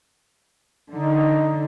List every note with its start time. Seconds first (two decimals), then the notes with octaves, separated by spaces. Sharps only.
0.92 D3 D#4